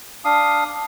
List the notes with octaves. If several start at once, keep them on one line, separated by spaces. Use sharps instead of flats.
D4 F5 D#6